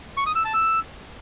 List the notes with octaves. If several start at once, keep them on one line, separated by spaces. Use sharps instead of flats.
C#6
D#6
E6
A5
E6